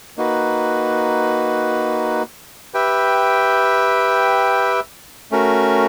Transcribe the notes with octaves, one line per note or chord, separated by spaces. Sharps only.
A#3 D#4 F#4 B4
G4 B4 E5 G5
A3 C#4 F#4 A#4